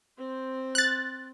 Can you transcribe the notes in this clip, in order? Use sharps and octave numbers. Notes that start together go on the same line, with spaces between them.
C4 C5
F#6 A6